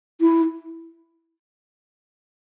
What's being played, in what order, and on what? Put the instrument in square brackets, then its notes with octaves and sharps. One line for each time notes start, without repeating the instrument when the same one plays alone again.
[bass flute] E4